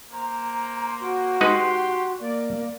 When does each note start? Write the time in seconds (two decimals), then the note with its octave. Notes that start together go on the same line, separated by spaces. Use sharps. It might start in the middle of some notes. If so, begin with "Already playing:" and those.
0.12 A#3 C5 A#5
1.00 F#4
1.41 G#3 D#4 G4 B4 C6
2.20 A#3 D5